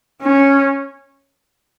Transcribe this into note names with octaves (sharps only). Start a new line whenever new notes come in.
C#4